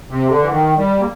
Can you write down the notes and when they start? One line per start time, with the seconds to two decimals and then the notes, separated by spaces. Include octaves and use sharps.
0.10 C3
0.29 D3
0.42 E3
0.50 D#3
0.77 G3
0.99 A#3